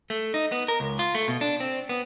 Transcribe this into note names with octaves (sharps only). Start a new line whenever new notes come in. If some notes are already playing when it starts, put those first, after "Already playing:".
A3
D#4
B3
A#4
C#2
F4
A3
B2
D4
C4
B3